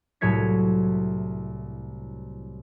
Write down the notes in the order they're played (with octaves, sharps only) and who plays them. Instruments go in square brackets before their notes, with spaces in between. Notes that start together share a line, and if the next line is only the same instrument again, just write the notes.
[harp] C2 A2 F#3 C#5 G#6 B6